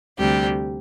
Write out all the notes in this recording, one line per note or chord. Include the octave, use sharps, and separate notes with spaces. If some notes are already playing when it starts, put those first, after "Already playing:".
D2 C3 G3 G4